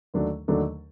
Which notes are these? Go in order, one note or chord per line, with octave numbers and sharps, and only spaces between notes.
D#2 D3 F#3 A3 D4
D#2 D3 F#3 A3 D4